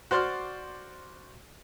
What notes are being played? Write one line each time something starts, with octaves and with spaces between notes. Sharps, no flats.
F#4 C5 D5 C6 F6